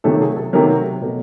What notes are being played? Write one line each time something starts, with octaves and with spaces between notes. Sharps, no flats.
C3 D#3 F#3 A3 A4
G#4
A4
C3 D#3 F#3 A3 A#4
B2 F#3 A3